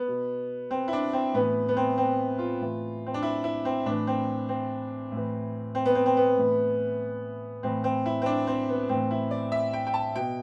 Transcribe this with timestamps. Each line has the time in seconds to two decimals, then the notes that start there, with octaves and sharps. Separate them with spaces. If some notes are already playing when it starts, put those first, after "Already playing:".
Already playing: B3
0.08 B2
0.71 C4
0.88 E4
0.93 D4
1.13 C4
1.34 A2 E3 B3
1.69 B3
1.77 C4
1.98 C4
2.38 F4
2.60 A2 E3
3.06 C4
3.14 D4
3.22 E4
3.44 E4
3.65 C4
3.86 A2 E3 D4
4.07 C4
4.49 C4
5.12 A2 E3
5.75 C4
5.85 B3
5.95 C4
6.06 C4
6.17 B3
6.37 A2 E3
7.63 A2 E3 C4
7.84 C4
8.06 E4
8.22 C4
8.26 D4
8.47 C4
8.69 B3
8.89 A2 E3 C4
9.11 E4
9.31 D5
9.52 E5
9.73 G5
9.87 G5
9.94 A5
10.16 B2 G5